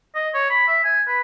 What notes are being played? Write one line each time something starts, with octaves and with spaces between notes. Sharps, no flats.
D#5
C#5
B5
E5
G#5
B4